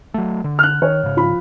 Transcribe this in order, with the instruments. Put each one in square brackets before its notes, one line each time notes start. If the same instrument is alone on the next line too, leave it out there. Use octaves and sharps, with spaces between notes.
[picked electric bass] F#3 A3
D3
[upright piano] F6 F#6
[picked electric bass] D#3 [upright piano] C#5
[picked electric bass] G#2 C#3
[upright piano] F3 B5